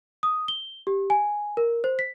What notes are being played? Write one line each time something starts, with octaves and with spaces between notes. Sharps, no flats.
D#6
G7
G4
G#5
A#4
C5
B6